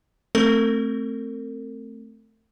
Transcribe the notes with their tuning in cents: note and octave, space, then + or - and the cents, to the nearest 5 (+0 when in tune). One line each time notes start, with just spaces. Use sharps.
A3 +0 C4 +0 A#4 -45